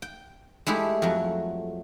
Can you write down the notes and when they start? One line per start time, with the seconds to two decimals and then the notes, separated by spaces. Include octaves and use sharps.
0.02 G5
0.67 G#3 A3 E4 G4
1.02 F2 F#3